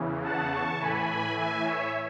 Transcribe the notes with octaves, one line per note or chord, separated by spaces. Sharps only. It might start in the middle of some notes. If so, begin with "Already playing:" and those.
Already playing: E2 C#3 E3
F#5 A5
A5 C#6
A2 E3 G#5 B5
E5 G#5
C#5 E5